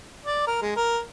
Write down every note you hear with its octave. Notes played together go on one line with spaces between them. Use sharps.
D5
A#4
G#3
A#4